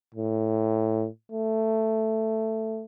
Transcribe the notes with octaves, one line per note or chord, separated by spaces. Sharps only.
A2
A3